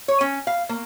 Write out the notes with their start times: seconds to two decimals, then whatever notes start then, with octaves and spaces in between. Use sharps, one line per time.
0.08 C#5
0.21 C#4
0.47 F5
0.69 A#3